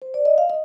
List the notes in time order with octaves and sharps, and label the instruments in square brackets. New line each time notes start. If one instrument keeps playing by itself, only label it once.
[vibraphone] C5
D5
D#5
F5
D#5